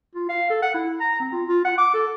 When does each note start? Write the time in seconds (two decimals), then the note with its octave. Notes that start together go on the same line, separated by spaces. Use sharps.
0.15 F4
0.29 F5
0.50 A4
0.62 F#5
0.74 E4
1.00 A#5
1.20 C4
1.32 F4
1.48 F4
1.65 F#5
1.78 D6
1.94 A4